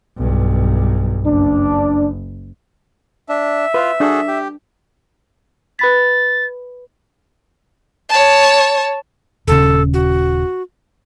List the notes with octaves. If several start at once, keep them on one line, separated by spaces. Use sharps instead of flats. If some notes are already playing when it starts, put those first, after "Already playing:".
B1 G2
F#1 D4
D4 E5
F4 B4
D4 F#4 G#4 A4
G4
B4 B5 A6 B6
C#5 A5
D#1 C#3 A4
F#4